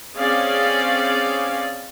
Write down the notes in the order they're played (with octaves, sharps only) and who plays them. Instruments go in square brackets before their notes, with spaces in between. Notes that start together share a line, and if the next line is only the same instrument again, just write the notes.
[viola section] C4 C#4 G#4 D5 F5